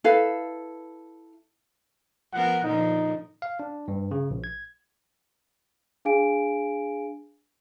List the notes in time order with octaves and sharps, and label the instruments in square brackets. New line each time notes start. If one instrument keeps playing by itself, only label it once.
[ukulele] E4 A4 B4 F5
[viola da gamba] F3 B3 A#4 [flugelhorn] F#5
[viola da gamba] A#2 D3 F3 [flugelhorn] D#4
[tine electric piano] F5
D4
G2
C#3
A#1
G#6
[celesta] D4 G#4 F5 G#5 D7